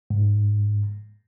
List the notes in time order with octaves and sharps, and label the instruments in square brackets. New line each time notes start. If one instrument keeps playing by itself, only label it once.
[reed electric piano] G#2